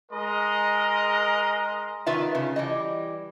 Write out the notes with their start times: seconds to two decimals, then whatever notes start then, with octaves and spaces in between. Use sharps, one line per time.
0.12 G#3 A#4 D#5 A#5 C6
2.06 D#3 F4 B4 E5
2.35 C#3
2.56 E3 G3 D#5